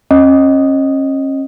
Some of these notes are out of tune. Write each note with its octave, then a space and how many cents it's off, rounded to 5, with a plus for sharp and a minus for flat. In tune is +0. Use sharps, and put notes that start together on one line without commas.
C#4 -35 D#5 +0